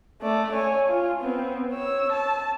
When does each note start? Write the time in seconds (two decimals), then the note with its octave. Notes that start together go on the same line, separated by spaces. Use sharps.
0.21 A3 D5
0.52 C#5 G#5
0.88 F4
1.21 B3 C4
1.72 C#5 E6
2.12 A5